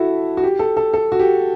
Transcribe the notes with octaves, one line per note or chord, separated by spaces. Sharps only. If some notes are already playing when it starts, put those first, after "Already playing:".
Already playing: E4 F#4 A4
F#4
G4
A4
A4
A4
F#4
G4